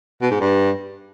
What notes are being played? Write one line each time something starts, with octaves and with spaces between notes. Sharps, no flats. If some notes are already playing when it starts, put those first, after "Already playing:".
B2
G#2
G2